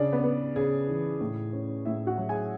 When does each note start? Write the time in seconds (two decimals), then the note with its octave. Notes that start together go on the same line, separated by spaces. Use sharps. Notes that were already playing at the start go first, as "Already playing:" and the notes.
Already playing: C#3 D4 D5
0.12 B3 B4
0.24 B3
0.56 C#3 G#4
0.88 E3
1.20 A2
1.53 C#4
1.85 A2 E4 E5
2.07 F#4 F#5
2.18 F#3
2.29 G#4 G#5